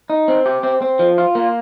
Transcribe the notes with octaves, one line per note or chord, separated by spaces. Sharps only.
D#4
C4
G4
C4
C4
F3
F4
A#3